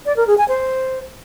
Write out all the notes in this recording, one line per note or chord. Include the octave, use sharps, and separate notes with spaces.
D5
A#4
G#4
G#5
C5